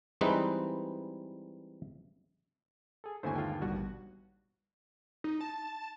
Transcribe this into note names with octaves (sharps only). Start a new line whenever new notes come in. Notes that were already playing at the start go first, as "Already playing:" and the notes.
E3 G3 G#3 C4 D#4 B4
G#4 A4
G1 D#2 A3 B3 C#4 C5 G#5
G#3 F4 A4 G5
A1 B2 G3 F#4
D#4
A5